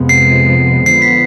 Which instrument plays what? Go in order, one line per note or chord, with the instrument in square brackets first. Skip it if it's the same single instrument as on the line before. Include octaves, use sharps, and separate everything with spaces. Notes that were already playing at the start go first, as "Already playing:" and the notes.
Already playing: [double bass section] F2 C3 F3 G#3 B3
[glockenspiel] C7
[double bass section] D3 F3 B3 [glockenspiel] C7
[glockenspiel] B6